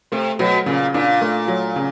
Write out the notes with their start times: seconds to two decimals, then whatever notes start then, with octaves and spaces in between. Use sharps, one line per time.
0.12 C3 A3
0.39 B2 F#3
0.66 A#2 C#3
0.94 A#2 D4
1.21 A3
1.48 F#3
1.76 C#3